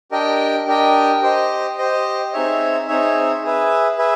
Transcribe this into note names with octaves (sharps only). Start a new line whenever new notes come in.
D4 G4 A#4 D#5 G5
D4 G4 A#4 D#5 G5
G4 C5 D#5
G4 C5 D#5
C4 D#4 G#4 C#5 E5
C4 D#4 G#4 C#5 E5
G#4 B4 E5
G#4 B4 E5